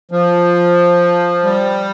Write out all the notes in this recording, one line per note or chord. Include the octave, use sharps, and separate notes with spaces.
F3
G3